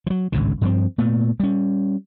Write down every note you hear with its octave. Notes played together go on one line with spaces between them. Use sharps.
F3 F#3
G#1 C#2 A2 D3
G2 F3 C4
A#2 A3 B3
G3 C#4